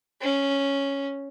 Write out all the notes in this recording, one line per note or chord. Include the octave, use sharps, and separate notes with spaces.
C#4